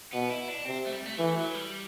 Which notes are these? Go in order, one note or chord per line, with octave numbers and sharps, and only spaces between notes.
B2 B3
E4
D4
C3 C4
A3
G3
A3
E3 A3
F#3
G3